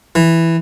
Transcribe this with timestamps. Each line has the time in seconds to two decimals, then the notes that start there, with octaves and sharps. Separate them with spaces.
0.15 E3